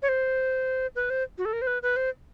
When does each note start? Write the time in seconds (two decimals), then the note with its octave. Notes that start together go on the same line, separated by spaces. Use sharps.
0.02 C#5
0.09 C5
0.96 B4
1.10 C5
1.38 F#4
1.45 A4
1.53 A#4
1.62 C5
1.67 B4
1.82 B4
1.96 C5